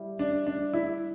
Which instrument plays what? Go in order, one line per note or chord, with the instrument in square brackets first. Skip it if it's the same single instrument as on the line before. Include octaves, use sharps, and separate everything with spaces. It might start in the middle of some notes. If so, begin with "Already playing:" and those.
Already playing: [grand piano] G3 E4
[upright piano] D4
D4
E4